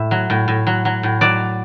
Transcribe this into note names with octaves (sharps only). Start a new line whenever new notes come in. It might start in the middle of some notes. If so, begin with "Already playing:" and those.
Already playing: A2 E5
F#3
A2
A2
F#3
F#3
A2
F#3 D5